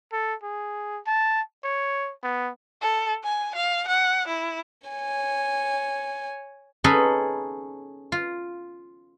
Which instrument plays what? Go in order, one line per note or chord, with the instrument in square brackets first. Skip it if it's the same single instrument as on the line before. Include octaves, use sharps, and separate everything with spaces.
[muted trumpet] A4
G#4
A5
C#5
B3
[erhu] A4
G#5
F5
F#5
E4
[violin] C#5 G#5
[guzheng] C#4 D#4 G#4 A4 B4
F4